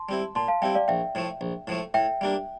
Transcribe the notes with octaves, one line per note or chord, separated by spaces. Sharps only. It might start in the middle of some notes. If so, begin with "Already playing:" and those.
Already playing: A5 C6
G3 C4 E4
A#2 A5 C6
F5 A5
G3 C4 E4 E5 G5
D5 F5
A#1 E5 G5
A2 F3 A3
A#1
A2 F3 A3
A2 E5 G5
G3 A#3 D4